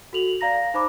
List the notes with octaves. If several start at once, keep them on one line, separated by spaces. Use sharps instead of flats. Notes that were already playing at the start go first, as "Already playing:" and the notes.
F#4 A4 F7 F#7
D5 F5 A#5 A#6
D#4 C5 B5 D6